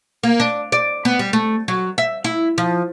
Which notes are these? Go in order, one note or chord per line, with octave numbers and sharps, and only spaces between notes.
A#3
D4
D5
B3
G3
A3
F#3
E5
E4
F3